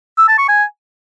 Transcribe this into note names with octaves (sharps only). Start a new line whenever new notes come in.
E6
A5
C#6
G#5